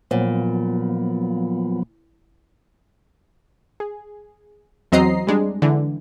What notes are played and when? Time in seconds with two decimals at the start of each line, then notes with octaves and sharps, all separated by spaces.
0.11 A#2 F3 F#3 B3
3.80 G#4
4.92 E2 F#3 C4 D#5 A#5 C7
5.27 G3 G#3 D4
5.62 D3 E3